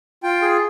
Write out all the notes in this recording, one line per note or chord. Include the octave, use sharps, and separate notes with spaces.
F4 G5
G#4